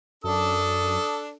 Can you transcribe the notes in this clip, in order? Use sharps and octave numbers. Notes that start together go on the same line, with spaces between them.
F#2 D4 A4 D#6